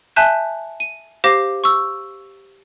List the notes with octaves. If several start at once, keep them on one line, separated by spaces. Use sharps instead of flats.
E5 G#5 A5 F#6 G6
D#7
G4 C5 F5 D6 A#6 C7
C#6 E6